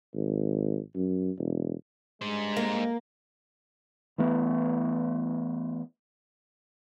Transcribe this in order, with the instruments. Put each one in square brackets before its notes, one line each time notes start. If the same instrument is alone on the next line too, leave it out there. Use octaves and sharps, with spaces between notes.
[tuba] G#1
F#2
E1
[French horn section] G2 G#3 [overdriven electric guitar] G#4 C5
[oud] A#3
[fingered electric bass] E3 A3 B3